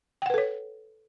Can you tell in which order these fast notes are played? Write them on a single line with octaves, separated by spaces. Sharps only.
G5 F#5 B4 A4 C#5